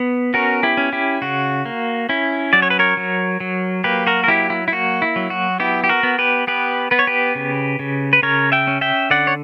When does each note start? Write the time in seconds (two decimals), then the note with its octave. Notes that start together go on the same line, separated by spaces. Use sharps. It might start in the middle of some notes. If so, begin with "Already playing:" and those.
Already playing: B3
0.34 C#4 F#4 A#4
0.63 E4 G4
0.77 C#4
0.93 E4 G4
1.22 C#3 F#4
1.66 A#3
2.09 C#4 E4
2.53 F#3 D5
2.62 C#5
2.70 B4
2.79 A#4 C#5
2.97 F#3
3.40 F#3
3.84 A#3 G4 B4
4.07 F#4 A#4
4.24 A#4
4.28 F#3 E4 G4
4.50 E4
4.68 E4
4.72 A#3 F#4
5.02 E4
5.16 F#3
5.30 F#4
5.60 B3 E4 G4
5.84 G4
5.89 F#4 A#4
6.03 B3
6.18 G4 B4
6.47 B3 G4 B4
6.91 B3 B4
6.99 C#5
7.07 G4 B4
7.35 C#3
7.79 C#3
8.13 B4
8.23 C#3 A#4 C#5
8.52 E5 G5
8.67 C#4
8.81 E5 G5
9.10 D3 D5 F#5
9.27 C#5